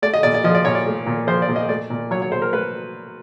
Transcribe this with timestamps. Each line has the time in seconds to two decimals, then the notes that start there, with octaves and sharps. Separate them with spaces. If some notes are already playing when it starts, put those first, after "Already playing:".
0.02 A3 D5
0.14 D#5
0.23 A#2 D5
0.34 D5
0.44 F3 D#5
0.55 D5
0.65 A#2 C#5
0.75 D5
0.87 A3
1.06 A#2
1.27 F3 C5
1.42 D5
1.48 A#2
1.56 D#5
1.69 A3 D5
1.90 A#2
2.11 F#3 C#5
2.22 C#5
2.32 A#2 C5
2.42 A#4
2.53 A3 B4